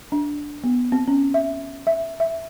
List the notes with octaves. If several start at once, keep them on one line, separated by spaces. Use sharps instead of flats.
D4
B3
C4
C#4
E5
E5
E5